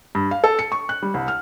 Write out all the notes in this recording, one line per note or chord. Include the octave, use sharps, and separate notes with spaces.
G2
F5
A4
C#7
C#6
F#6
G3
C2
F6